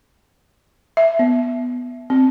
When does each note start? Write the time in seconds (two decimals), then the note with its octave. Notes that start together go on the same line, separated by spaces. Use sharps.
0.97 E5
1.19 B3
2.10 C4